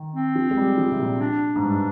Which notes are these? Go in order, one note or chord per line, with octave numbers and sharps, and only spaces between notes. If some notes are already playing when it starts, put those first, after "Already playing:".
Already playing: D#3
C4
F3
G#3
G3
F3
C3
A#2
D4
G#2
G2